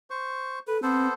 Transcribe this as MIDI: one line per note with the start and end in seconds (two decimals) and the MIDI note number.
0.10 0.59 72
0.10 0.59 85
0.67 0.80 69
0.67 0.78 71
0.83 1.13 59
0.83 1.07 60
0.83 1.13 69
0.83 1.13 72